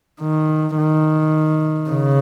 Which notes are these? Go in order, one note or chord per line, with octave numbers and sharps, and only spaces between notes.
D#3
D#3
C#3